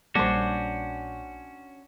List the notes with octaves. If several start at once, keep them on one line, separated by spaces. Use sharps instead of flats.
A#1 G3 A#3 C#4 D4 F#4 C5